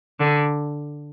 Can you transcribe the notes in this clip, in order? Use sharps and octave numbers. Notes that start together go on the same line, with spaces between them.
D3